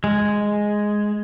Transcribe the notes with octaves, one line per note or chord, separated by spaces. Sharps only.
G#3